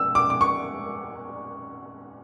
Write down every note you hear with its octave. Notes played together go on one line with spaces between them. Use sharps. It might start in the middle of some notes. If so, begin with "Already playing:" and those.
Already playing: E6
D6
D6
C#6